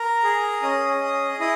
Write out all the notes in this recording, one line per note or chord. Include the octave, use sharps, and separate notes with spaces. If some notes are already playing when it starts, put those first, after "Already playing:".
Already playing: A#4 A#5
G#4
C#4 D#5 D#6
G#4
E4 D#5 D#6